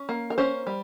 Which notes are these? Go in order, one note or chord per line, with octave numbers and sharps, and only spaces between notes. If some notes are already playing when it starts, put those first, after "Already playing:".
Already playing: C#4
A#3
A#4
C#4 C5
G3